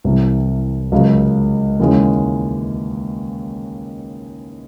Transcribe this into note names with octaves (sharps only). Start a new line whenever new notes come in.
C2 C3 E3 G3
C#2 C#3 F#3 A#3
D#2 C#3 E3 G#3 C#4